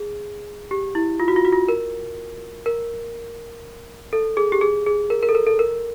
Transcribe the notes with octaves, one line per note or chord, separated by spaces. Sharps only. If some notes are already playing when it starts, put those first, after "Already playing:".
Already playing: G#4
G4
E4
F4
F#4
F4
F#4
F4
A#4
A#4
A4
G#4
G4
G#4
G#4
A#4
A#4
A4
A#4
A4
A#4